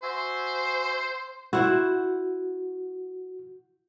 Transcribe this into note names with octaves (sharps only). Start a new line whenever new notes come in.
F#4 C5 E5 G#5
E4 F#4 C5 F#5